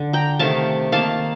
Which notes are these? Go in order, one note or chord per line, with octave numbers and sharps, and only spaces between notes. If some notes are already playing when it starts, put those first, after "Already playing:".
Already playing: D3
G5 A#5
C3 D#3 A3 F5 A5
D#3 A#3 F5 A5